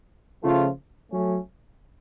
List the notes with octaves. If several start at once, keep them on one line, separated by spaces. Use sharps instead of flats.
C#3 F3 A3 F4
F#3 A3 C#4